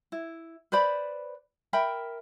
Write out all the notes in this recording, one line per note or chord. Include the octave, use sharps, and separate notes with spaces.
E4
B4 C5 D5 B5
A#4 E5 G5 B5